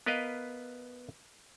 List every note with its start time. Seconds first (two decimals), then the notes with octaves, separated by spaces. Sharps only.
0.06 B3 A#4 B4 D#5 F5